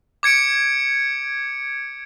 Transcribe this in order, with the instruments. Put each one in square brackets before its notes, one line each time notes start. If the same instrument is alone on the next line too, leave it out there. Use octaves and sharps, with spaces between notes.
[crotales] D6 G#6 C#7 D7